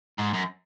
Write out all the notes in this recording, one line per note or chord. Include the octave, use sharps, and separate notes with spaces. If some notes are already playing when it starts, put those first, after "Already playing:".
G#2
F#2